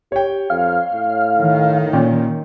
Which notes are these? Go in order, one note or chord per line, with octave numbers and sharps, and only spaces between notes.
G4 C#5 G5
F2 F5
A2
D#3
A#2 C#4 G5